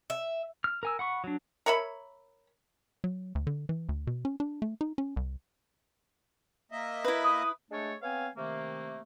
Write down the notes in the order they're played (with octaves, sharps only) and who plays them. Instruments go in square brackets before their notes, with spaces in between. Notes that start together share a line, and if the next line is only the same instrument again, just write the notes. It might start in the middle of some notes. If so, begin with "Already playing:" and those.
[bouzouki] E5
[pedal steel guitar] F6
A#4 G#5 E6
F#5 B5 C#6
F#3 D4
[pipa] A#4 C#5 E5 B5
[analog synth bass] F#3
D2
D3
E3
D2
B2
C#4
D4
A3
D#4
C#4
C2
[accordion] A#3 D#5 E5
[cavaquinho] E4 B4
[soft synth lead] D#6
[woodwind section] G#3 A3 D4 A4 C#5
B3 C4 C#5 F5 G#5
C3 D#3 A3 A#3